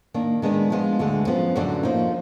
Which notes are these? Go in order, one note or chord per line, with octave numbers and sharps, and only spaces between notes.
D#3 A#3 D4
D#3 G#3 B3 D4
F3 G#3 B3 F4
D2 D3 G#3
F#2 F3 B3
F#2 D3 F#3 D4
F3 A#3 D#4